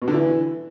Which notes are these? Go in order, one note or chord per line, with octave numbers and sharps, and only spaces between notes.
B2
D3
E3